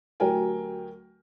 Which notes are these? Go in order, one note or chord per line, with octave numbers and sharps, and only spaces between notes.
D2 F#3 G4 A#4 G5 G#5